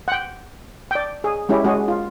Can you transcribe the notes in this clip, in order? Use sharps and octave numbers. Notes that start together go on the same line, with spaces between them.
F#5 G5
D5 G5
G#4
G#3 C#4 E4 G4
G#3 C#4 F#4 G#4
F4